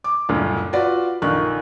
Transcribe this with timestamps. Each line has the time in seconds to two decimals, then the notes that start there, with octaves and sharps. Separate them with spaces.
0.04 D6
0.29 F#1 D2 G2 A#2
0.73 F4 F#4 B4 D5
1.22 A#1 D3 D#3 C#6 F#6